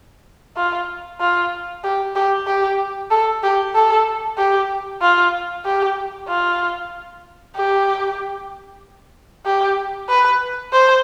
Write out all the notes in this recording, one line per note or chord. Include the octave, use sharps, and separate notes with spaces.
F4
F4
G4
G4
G4
A4
G4
A4
G4
F4
G4
F4
G4
G4
B4
C5